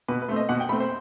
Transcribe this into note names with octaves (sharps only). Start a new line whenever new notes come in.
B2 B4
B4
A3 C4
D#5
B2 F#5
G5
A3 C4 B5
C5